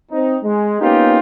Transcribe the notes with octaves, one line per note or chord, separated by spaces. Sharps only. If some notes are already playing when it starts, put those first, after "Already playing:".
C4 D#4
G#3
A#3 B3 C#4 D#4 F4 G4